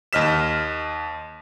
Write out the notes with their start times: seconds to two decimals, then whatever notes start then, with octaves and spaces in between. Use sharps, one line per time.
0.13 D#2 D#5 F6 B6 E7